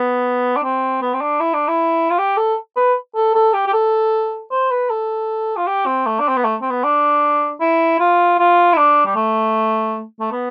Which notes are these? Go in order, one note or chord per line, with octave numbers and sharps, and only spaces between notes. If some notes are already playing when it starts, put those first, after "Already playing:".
Already playing: B3
D4
C4
B3
C4
D4
E4
D4
E4
F4
G4
A4
B4
A4
A4
G4
G4
A4
C5
B4
A4
F4
G4
C4
A3
D4
C4
B3
A3
C4
B3
D4
E4
F4
F4
E4
D4
G3
A3
A3
B3